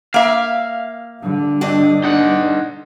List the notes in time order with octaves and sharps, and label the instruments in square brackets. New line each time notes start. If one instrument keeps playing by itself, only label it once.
[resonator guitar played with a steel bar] A#3 E5 [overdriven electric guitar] F5
[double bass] D3 G3
[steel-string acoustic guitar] G2 D4 D#5
[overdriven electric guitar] D#4 F#5